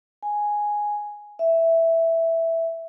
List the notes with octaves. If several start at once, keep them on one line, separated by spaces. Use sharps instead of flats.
G#5
E5